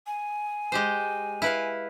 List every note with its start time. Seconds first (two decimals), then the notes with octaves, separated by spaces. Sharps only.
0.07 G#5
0.72 G#3 G4 C5
1.42 E4 B4 F5